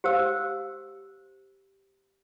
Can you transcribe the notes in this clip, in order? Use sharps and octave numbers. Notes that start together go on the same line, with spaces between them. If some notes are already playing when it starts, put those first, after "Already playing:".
G4 C5 F5 E6